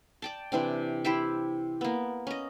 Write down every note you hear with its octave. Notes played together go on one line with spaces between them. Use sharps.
D5 G5 A5
C3 E3 C4 D4
E4 G4 C5 E5
A#3 B3
C#4 D#5